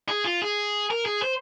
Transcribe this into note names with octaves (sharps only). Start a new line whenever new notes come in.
G#4
F4
G#4
A#4
G#4
C5